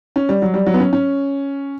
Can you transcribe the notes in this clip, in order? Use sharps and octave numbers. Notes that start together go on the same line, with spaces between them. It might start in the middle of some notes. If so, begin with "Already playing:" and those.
C#4
G3
F#3
G3
F#3
B3
C#4
C#4